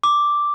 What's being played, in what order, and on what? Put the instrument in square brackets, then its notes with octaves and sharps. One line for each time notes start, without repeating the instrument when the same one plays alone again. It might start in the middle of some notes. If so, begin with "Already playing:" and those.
[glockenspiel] D6